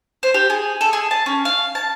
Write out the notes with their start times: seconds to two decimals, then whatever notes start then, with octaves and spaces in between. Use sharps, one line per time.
0.23 C5
0.34 G4
0.50 G#4
0.81 A4
0.93 G#4
1.11 A5
1.26 C#4
1.45 F5
1.75 A5